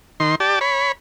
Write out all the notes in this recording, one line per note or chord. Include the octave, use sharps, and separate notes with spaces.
D#3 C6
G4 D5 A5
C#5 B5